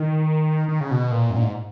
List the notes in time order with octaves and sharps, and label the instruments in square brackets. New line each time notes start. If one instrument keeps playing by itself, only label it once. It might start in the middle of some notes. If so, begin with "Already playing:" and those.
Already playing: [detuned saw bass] D#3
D#3
C#3
B2
A#2
F#2
A#2
G#2